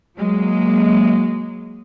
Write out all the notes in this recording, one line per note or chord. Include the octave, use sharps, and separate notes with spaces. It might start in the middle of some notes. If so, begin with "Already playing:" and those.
F#3 G#3 A#3